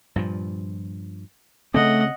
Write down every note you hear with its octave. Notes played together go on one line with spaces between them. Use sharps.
G2 A#2 F3
C#3 A3 C4 D#5 F#5